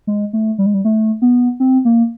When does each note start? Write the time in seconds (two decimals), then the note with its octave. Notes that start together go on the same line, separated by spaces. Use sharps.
0.07 G#3
0.33 A3
0.58 G3
0.66 G#3
0.74 G3
0.85 A3
1.22 B3
1.60 C4
1.85 A#3